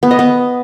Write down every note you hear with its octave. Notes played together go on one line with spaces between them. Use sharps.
B3
D#5
B3